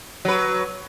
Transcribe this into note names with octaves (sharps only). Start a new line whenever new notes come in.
F#3 B4